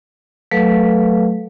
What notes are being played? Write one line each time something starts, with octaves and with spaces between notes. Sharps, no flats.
F#3 A3 A4 B4 F5